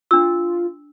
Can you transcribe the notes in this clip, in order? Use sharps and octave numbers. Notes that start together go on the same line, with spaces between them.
D4 F4 E6